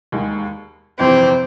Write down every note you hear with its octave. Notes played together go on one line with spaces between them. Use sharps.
E1 D#2 D#3 G#3
G1 F2 C3 E3 C4